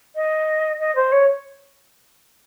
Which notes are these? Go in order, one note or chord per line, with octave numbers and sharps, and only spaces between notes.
D#5
D#5
C5
C#5